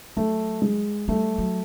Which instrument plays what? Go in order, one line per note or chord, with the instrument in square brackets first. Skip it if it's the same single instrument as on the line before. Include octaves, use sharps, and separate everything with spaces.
[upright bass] F#3 [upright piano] A3
[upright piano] G#3
[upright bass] G3 [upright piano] A3
[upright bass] F#3